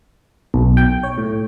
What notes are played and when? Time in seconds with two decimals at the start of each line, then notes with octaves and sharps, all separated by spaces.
0.54 B1
0.77 G5
1.03 C#5
1.18 A2